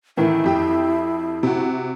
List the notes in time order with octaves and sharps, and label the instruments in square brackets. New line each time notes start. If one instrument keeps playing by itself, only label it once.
[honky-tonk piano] A2 D#3 E3 [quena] E4
[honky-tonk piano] F2 G4 G5
C3 F#4